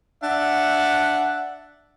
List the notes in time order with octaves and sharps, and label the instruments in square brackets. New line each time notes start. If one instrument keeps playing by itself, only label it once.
[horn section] D4 E5 F#5